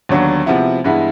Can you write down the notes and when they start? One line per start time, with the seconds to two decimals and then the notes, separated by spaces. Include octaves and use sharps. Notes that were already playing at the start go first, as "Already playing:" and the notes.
0.09 D#2 D3 F#3 B3 D4
0.46 C3 F3 G#3 B3 E4
0.84 G2 E3 G#3 B3 E4